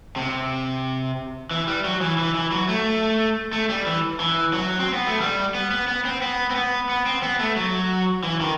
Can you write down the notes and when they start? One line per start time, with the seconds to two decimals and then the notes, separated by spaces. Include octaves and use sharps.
0.16 C3
1.51 E3
1.67 G3
1.84 F#3
2.01 E3
2.18 E3
2.35 E3
2.52 F#3
2.69 A3
3.53 A3
3.69 G3
3.86 E3
4.20 E3
4.53 F#3
4.79 C4
4.93 B3
5.07 A3
5.21 G3
5.54 B3
5.71 B3
5.88 B3
6.05 C4
6.22 B3
6.50 C4
6.55 B3
6.89 B3
7.06 C4
7.23 B3
7.39 A3
7.56 F#3
8.24 E3
8.41 D#3